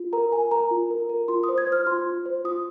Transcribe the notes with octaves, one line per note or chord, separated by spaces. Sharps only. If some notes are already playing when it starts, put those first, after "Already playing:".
Already playing: F4
A#4 A#5
A#4 G#5
A#4 A#5
F4
A#4
A#4
F4 C6
D#6
C5
G#6
C5
F6
F4 C6
F4
C5
F4 D#6